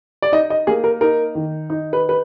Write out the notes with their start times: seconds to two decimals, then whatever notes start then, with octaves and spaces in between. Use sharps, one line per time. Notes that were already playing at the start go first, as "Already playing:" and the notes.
0.22 D5
0.32 D#4 D#5
0.50 D#5
0.67 A#3 G#4
0.84 A#4
1.01 D#4 A#4
1.35 D#3
1.70 D#4
1.93 B4
2.09 B4